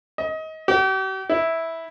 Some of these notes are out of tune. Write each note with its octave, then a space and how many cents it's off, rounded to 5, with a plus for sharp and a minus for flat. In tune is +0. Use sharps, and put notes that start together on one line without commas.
D#5 +25
G4 -45
E4 -10